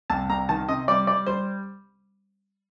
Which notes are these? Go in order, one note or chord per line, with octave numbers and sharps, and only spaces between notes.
C2 A5
C2 A#5
D#3 A5
C3 D#5
G3 D5
G3 D5
G3 C5